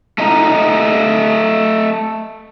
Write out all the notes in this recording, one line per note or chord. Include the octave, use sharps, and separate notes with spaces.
A3 D#5 A#5